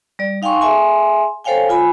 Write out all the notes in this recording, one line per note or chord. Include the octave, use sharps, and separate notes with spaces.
G3 D5
D#4 F5 G5 G#5 C6 C#6
G#4 E5 G#5 C6
A4 C5 C#5 F5 G5 G#5
F4 G#5 B5